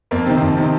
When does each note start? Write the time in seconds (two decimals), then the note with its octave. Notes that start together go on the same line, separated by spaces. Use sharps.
0.11 F2 A#3
0.26 C3 D#3 C4
0.42 F2
0.57 C3 D#3